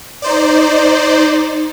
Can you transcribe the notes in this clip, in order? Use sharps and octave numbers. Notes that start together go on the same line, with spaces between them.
D#4 C5 D5